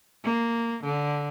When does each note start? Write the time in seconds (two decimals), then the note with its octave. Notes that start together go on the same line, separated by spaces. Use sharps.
0.24 A#3
0.84 D3